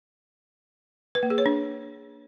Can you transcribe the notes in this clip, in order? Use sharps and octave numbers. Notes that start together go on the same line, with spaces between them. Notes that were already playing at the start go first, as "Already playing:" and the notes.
B4
A#3
G#4
C#5
D4